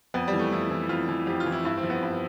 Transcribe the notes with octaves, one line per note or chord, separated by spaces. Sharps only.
F2 B3
G3
E3
A3
F2 E4
E3
F2 F4
E3
F2 G4
F4
E3
E4
G2 E4
C4
F3
B3
G2